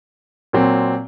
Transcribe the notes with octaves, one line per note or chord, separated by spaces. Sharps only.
A#2 F#3 C4